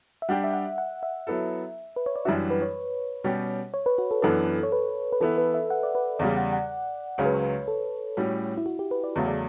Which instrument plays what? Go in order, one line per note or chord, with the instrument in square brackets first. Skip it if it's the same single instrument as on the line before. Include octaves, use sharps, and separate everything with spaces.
[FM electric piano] E5
[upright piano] G3 D4 G4 [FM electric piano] F#5
[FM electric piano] E5
F#5
F#5
E5
[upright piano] F#3 B3 E4 A4
[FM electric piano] B4
C#5
D5
[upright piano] F#2 E3 G3 D4 F#4 [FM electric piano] E5
[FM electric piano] B4
C#5
[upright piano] B2 G3 C#4 G4
[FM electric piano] C#5
B4
F#4
A4
[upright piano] F#2 E3 B3 D4 [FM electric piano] A4
[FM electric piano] C#5
B4
B4
[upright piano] E3 B3 E4 [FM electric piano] A4
[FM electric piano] B4
E5
F#5
D5
B4
[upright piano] E2 C#3 G3 [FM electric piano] D5
[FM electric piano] F#5
F#5
[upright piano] C#2 C#3 F#3 C#4 [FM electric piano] C#5
[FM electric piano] B4
C#5
B4
A4
[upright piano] A2 G3 C#4 [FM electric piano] F#4
[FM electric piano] E4
F#4
G4
B4
D5
[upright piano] E2 C#3 F#3 A3 C#4
[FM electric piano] D5